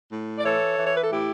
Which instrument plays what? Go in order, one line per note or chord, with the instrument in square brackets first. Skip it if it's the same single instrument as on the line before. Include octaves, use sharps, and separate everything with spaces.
[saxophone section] A2
D5
E3 A4 C#5
E3
C#5
B4
A4
A2 E4 G4